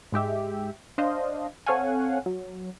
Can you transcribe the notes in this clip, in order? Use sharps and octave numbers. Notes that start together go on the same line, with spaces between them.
G#2 G#3 G4 E5
D4 C5 D#5 F5
C4 A4 C#5 F5 F#5 G#5
F#3